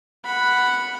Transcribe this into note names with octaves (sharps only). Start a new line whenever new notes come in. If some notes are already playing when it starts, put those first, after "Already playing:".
F#5 B5